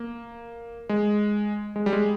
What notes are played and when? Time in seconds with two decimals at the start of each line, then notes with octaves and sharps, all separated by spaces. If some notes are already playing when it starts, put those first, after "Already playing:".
Already playing: A#3
0.89 G#3
1.76 G#3
1.86 G3
1.93 G#3